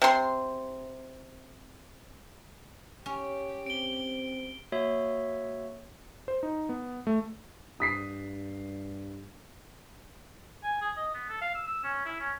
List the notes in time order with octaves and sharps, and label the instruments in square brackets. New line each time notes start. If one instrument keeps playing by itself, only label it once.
[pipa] C3 C6
[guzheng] C#4 [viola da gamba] G4
[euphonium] C4 [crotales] D7 G7
[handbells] A#3 F#4 C#5 E5
[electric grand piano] C5
D#4
B3
A3
[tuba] G2 [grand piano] D#6 B6 C7
[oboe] G#5
G#4
D#5
B3
A4
F5
E6
E6
C#4
E4
C#4